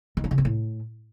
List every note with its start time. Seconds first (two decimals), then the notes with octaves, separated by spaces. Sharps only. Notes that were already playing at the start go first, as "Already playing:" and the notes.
0.17 D#3
0.24 D4
0.31 C#3
0.38 C4
0.45 A2